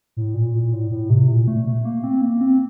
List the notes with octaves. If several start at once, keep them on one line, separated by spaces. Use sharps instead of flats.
A2
A#2
A#2
A2
A2
C3
A#2
A3
A3
A#3
C4
A#3
C4